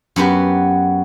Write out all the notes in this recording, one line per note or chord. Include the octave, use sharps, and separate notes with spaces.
F#2 B3 F#4 G4